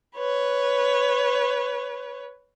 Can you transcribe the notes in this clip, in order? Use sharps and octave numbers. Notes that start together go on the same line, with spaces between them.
B4 C#5